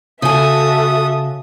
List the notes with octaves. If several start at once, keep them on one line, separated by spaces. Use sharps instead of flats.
C#3 F#4 A4 E5 G#5 D#6